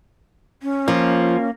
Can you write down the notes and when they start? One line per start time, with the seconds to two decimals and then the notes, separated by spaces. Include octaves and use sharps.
0.63 C#4
0.88 F3 A#3